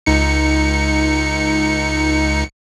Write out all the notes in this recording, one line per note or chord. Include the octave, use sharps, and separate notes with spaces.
C#2 D#4 C#7